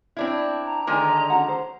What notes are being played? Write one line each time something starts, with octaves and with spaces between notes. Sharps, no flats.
C4 D4 E4
A#5
D3 D#3 G#3 E4 B4 G#5 A#5
D5 D#5 A5
C#4 F#4 F#5
C5